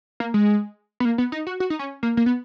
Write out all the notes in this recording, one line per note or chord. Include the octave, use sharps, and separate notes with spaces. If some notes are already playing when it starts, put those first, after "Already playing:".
A#3
G#3
B3
A#3
B3
D#4
F#4
F#4
D#4
C#4
A#3
A#3
B3